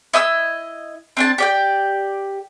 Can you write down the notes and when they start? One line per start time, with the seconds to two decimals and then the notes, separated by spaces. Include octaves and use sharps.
0.13 E4 D#5 D#6 E6
1.17 C4 D4 A5
1.38 G4 D5 G5